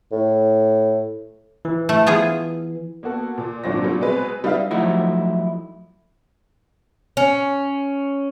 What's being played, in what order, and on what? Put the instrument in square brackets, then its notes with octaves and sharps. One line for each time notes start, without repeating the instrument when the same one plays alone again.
[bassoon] A2
[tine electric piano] E3
[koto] A3
B3 F4 G#4
[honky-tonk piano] A#3 B3 F#4 A4
A#2
G#1 A#2 F#3 D4 C5 A#6
A#2 F#3 G3
B2 G#3 C4 B4
G3 D#4 B4 E5 F5
[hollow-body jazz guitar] F3 F#3 A3 D#4 E4 F#4
[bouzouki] C#4